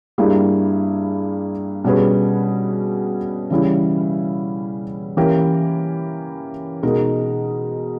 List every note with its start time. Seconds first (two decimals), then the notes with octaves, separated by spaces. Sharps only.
0.18 G2 G3 A#3 E4 G#4
1.84 B2 G3 C#4 G#4 B4
3.50 C#3 E3 G3 C#4 E4
5.17 E3 A#3 C#4 G4 A#4
6.83 B2 G#3 D#4 A#4